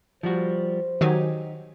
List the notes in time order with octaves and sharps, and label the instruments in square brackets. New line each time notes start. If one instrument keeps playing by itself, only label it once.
[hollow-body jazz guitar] F3 G3 F#4 [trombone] C5
[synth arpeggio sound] D#3 F#3 G#5 [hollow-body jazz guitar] D#4 G4